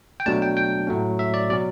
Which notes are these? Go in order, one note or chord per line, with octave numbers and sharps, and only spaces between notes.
G5
B2 F#3 A3 D4 A5
G5
G5
A2 F#3 A3 C#4
E5
D5
B2 F#3 C#4 D5